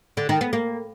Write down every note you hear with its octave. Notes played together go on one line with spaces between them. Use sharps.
D3
D#3
B3
A#3